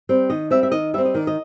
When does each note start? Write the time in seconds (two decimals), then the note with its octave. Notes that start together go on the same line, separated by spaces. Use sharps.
0.09 G3 C4
0.30 D#3 D#5
0.51 G3 C4 E5
0.63 E5
0.71 D#3 D#5
0.94 G3 C4 E5
1.05 D#5
1.14 D#3 D5
1.27 D#5